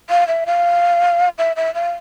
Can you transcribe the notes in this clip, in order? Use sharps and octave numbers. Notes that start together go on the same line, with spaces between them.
F5
E5
F5
E5
E5
F5